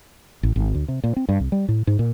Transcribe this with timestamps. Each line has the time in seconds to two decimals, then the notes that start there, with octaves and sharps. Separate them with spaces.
0.43 A1
0.56 G#1
0.74 D2
0.88 C3
1.04 A#2
1.16 C4
1.29 G2
1.40 C2
1.52 G3
1.68 A2
1.87 G#2
1.99 A#2